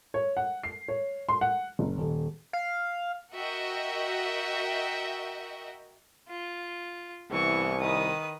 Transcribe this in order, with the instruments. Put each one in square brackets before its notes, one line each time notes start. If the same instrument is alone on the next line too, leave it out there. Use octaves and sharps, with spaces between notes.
[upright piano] C#5
F#5
C7
C#5
C6
F#5
F#1
D#1
[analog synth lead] F5
[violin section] F#4 A#4 D#5 E5 G5
[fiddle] F4
[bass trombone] C2 [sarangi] E3 [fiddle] B3 C#6
[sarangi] D#3 [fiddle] B4 D#6